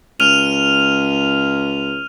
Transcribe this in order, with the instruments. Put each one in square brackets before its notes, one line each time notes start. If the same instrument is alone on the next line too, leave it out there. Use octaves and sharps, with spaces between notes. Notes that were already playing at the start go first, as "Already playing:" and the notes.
[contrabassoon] C#2 [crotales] F6 D#7 F7